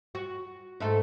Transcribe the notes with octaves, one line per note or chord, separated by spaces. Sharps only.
F#4
G#2 A3 A4